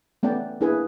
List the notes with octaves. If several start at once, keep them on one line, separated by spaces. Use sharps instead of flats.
A3 B3 C#4 D5 G5
A#3 D4 E4 G#4 B4 G#5